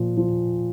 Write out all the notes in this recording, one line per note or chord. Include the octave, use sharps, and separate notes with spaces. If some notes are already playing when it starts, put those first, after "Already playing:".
Already playing: A#2 F3
F3